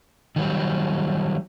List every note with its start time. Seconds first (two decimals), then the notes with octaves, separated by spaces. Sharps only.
0.36 D#3 F#3 G3